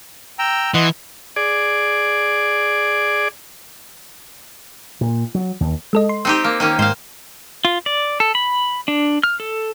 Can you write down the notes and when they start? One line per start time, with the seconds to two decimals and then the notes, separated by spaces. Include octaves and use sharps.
0.39 G5 A#5 E6
0.74 E3 D#5 F#5 C6
1.36 G#4 D5
5.01 A#2
5.35 F#3
5.61 D#2
5.93 G#3 A4 D#5
6.09 C6
6.25 C4 D#4 G4
6.44 A#3
6.60 D#3 A#3 C#4
6.79 G#2 C5 F5
7.65 F4
7.86 D5
8.20 A4
8.35 B5
8.88 D4
9.23 F6
9.40 A4